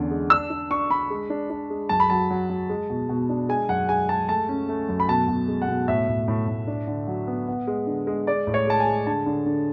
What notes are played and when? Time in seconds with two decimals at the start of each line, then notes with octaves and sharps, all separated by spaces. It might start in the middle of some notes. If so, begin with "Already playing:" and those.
Already playing: E2 D3 C#4
0.11 G#3
0.30 D4 E6
0.50 D4
0.70 D4 C#6
0.90 D4 B5
1.10 G#3
1.30 D4
1.50 D4
1.70 G#3
1.89 F#2 A5
2.00 B5
2.10 F#3 A5
2.30 F#3
2.50 F#3
2.70 G#3
2.90 B2
3.09 B2
3.29 D4
3.49 G#3 G#5
3.69 F#2 F#5
3.89 G#3 G#5
4.09 G#3 A5
4.28 A3 A5
4.49 C#4
4.69 A3
4.89 F#2
5.00 B5
5.08 B2 A5
5.28 B2
5.48 G#3
5.62 F#5
5.68 B2
5.88 A2 E5
6.08 A2
6.28 A2
6.48 A2
6.68 D4
6.87 D3
7.08 F#3
7.27 B3
7.48 B3
7.67 G#3
7.87 D3
8.07 G#3
8.27 G#3 D5
8.47 A2
8.54 C#5
8.67 G#3 A5
8.80 G#5
8.86 G#3
9.07 D3 A5
9.26 D3
9.46 D3